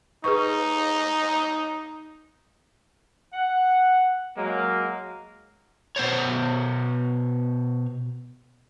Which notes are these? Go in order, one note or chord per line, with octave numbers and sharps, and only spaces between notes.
D#4 G#4 B4 C#6
F#5
F#3 G#3 A#3
B2 B3 C5 C#5